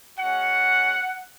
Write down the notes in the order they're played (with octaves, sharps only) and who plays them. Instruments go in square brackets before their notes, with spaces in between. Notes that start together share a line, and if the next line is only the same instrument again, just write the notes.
[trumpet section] G#3 C#4 F#4 F#5